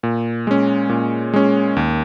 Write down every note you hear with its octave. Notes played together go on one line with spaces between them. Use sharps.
A#2
G#3 C#4
A#2
G#3 C#4
D#2